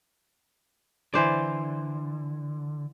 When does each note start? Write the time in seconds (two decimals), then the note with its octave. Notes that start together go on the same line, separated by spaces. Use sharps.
1.14 D3 E3 C5 D5